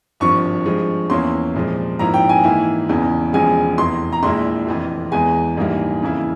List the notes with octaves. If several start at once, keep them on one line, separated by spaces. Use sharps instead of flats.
G#1 G2 F3 C#6
G2 F3 G#3
E2 E3 A#3 C#4 E4 C6
C2 A#2 F3 G#3
G#1 G#2 F3 A#3 E4 A#5
G5
G#5
G#2 E3 A#3 E4
E1 E2 C#3 E3
E1 E2 C#3 F3 G#3 G#5
F1 E2 E3 C6
A#5
A#1 A#2 G#3 E4 C6
F1 F2 E3
E2 E3 G#3 G#5
A#1 G#2 E3 G3 A#3
F2 C#3 E3 A#3 E4